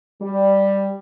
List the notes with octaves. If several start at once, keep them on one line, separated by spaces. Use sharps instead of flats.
G3